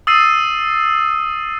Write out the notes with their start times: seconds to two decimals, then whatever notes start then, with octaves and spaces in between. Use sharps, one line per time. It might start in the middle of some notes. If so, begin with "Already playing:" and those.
0.07 D#6 E6 A6 C7 D#7